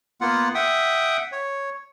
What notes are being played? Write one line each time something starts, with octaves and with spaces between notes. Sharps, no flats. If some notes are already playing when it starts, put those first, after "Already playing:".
A#3 B3 F4 F#5
E5 F#5 G5 D#6
C#5